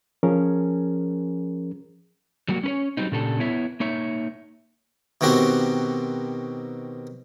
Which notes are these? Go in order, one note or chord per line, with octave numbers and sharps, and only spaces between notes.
F3 C#4 G#4 A#4
F#3 G3 A#3 F#4
C#4 B4 C#5
F#3 G3 C4 D#4
A#2 C#3 G3 D4 A4
B3 E4 C#5 E5
A#3 D#4 C#5 E5
B2 D#3 C4 F#4 G4